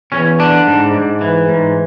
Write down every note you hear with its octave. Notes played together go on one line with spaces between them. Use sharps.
E2 C#4
D3 D4
G#2
G#2
E3
G#2